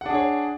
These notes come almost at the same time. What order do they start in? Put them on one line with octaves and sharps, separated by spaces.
F#5 D4 G#4 C#5